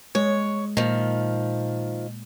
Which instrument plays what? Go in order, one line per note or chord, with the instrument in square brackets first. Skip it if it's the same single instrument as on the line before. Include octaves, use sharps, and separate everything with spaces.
[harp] G#3 [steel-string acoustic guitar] C#5
[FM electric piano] A#2 [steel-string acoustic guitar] D#3 F3